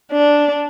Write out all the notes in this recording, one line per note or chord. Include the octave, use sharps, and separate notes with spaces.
D4